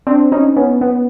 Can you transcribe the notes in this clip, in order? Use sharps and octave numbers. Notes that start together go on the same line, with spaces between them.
C4 D4
C#4 D#4
B3 C#4
B3